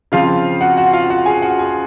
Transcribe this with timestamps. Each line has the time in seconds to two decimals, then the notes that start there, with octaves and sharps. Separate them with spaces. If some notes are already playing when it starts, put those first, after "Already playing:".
0.12 C#3 F3 C4 F4 F5
0.61 F#4 F#5
0.77 F#4 F#5
0.93 F4 F5
1.10 F#4 F#5
1.26 G#4 G#5
1.42 F#4 F#5
1.59 G#4 G#5